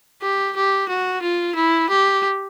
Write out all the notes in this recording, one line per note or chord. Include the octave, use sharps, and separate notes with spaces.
G4
G4
F#4
F4
E4
G4